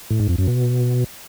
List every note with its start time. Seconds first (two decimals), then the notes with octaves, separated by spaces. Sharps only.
0.10 A2
0.20 G#2
0.29 F2
0.38 F#2
0.47 B2